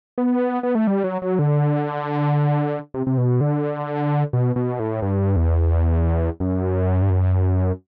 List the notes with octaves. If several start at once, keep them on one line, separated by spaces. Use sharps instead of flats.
B3
B3
A3
G3
F#3
F#3
D3
C3
C3
B2
D3
B2
B2
A2
G2
E2
F#2
G2
F#2